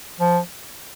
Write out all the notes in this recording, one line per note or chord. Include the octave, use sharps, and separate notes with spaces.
F3